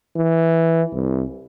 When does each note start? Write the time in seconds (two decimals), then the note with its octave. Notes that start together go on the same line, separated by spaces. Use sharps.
0.16 E3
0.93 C2